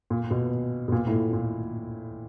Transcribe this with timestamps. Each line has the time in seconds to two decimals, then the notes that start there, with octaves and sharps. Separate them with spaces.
0.10 A#2
0.31 B2
0.88 B2
0.92 A#2
1.07 A2
1.12 A#2
1.33 A#2